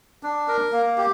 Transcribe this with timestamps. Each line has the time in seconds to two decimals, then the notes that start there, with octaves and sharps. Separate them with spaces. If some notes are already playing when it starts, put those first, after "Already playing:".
0.23 D4
0.48 A#4
0.73 A#3
0.98 G4